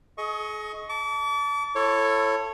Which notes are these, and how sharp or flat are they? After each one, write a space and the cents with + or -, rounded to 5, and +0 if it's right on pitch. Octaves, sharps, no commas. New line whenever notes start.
G#4 +40 D#5 +15 C#6 +0
A5 +0 D6 -40
E4 +30 A4 +15 C#5 -10